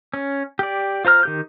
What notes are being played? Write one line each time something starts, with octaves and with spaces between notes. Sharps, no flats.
C#4
G4 D5
F4 C5 A#5 F6
D#3 G4 G6